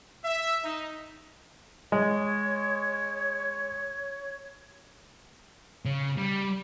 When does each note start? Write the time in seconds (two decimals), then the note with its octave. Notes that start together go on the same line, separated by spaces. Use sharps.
0.24 E5
0.64 D#4
1.92 G#3 C#5
5.85 C#3
6.17 G3